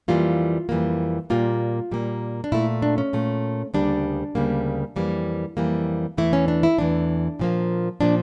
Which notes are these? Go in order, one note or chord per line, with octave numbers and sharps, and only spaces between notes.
F2 E3 G3 A#3 F4
F2 E3 G3 A#3
A#2 G3 A#3 F4
A#2 G3 A#3
D4
A#2 A3 E4
D4
C#4
A#2 A3
D2 C#3 G3 A#3 D4
D2 C#3 G3 A#3
F2 E3 G3 A#3
F2 E3 G3 A#3
E2 E3 A3 E4
C#4
D4
E4
E2 E3 A3 D4
A#2 F3 A#3
A#2 F3 A#3 D4